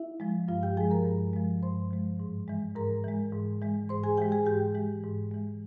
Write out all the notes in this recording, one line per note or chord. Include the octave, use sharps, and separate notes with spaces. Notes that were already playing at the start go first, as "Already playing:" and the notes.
Already playing: E4 E5
F3 G#3
G2 F4 F5
G4 G5
F3 G#3 G#4 G#5
A#4 A#5
G2
F3 G#3
G2 C5 C6
F3 G#3
G#2
E3 G#3
G#2 A#4 A#5
E3 G#3
G#2
E3 G#3
G#2 C5 C6
G#4 G#5
E3 G#3 G4 G5
G#4 G#5
G#2 G4 G5
E3 G#3
G#2
E3 G#3